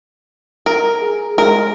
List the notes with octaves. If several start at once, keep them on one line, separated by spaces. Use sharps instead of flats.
A#4
G#4
G#3 A#4